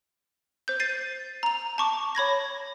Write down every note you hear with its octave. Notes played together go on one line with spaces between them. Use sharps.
C5 G6
A6 C7 D#7
A#5 F7
A5 C#6 D6
C#5 B5 G#6 A#6